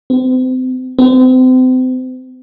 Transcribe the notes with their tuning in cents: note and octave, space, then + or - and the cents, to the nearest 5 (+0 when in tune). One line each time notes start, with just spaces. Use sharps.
C4 -35
C4 -35